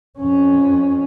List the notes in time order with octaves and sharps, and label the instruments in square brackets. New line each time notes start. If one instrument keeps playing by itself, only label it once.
[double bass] F2 C#4